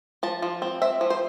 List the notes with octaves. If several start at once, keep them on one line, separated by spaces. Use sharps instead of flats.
F3 A5
F3
C4
C4 E5
F3
C5